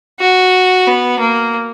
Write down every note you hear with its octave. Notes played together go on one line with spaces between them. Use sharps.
F#4
B3
A#3